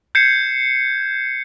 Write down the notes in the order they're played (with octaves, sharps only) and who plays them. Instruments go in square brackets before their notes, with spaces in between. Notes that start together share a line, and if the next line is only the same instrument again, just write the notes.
[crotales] G6 G#6 C7 C#7 E7